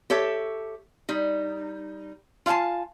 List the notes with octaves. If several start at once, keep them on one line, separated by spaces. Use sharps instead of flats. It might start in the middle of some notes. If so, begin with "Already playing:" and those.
G4 A4 C#5 E5
G3 D#4
F4 F5 F#5 G#5 A5